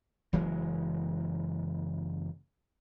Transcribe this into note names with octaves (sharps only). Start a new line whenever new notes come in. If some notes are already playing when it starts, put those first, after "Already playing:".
F#1 E3 F#3 G#3